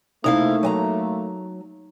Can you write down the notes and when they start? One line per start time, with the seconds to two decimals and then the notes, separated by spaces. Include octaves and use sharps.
0.24 C3 A3 A#3 D#4 E4 F5
0.63 F#3 G#5 A#5